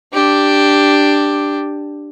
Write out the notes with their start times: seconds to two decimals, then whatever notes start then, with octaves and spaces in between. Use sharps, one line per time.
0.13 D4 G4